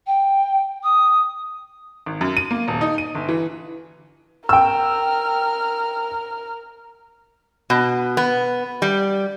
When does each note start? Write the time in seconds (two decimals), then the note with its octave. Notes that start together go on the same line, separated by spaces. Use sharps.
0.07 G5
0.83 D#6
2.06 G#1
2.21 F#2
2.37 D#7
2.51 A#3
2.68 D#1
2.81 D#4
2.98 D#7
3.15 G1
3.28 E3
4.49 A#4 G5 E6 F6
7.70 B2
8.17 B3
8.82 G3